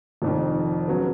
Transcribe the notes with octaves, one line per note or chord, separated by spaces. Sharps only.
F1 F2 D#3
C#3 F#3 B3